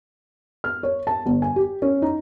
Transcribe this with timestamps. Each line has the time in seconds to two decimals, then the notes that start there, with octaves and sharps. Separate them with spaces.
0.64 F6
0.83 C#5
1.07 A5
1.26 G1
1.42 G#5
1.56 G4
1.82 C#4
2.02 D#4